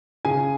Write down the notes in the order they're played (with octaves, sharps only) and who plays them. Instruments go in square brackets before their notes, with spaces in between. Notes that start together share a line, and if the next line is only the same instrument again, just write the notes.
[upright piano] C#3 G#4 G#5